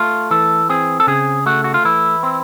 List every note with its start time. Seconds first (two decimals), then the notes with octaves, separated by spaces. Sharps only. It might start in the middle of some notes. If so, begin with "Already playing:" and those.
Already playing: A3 F4
0.31 E3 A4
0.69 C4 G#4
1.00 A4
1.07 C#3 G#4
1.46 A3 F#4
1.64 F#4
1.74 F4
1.85 E3 E4
2.23 C4